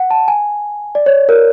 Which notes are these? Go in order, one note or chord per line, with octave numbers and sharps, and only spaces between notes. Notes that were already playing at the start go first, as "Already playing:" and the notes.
Already playing: F#5
A5
G#5
D5
C#5
A#4